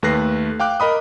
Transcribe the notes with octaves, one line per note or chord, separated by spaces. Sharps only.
D#2 A3 B4 F#6 A#6 C7
F5 G5 D6 F#6
A#4 D#5 B5 D#6